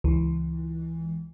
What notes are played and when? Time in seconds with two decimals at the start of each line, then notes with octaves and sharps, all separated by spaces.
0.04 C#2 E3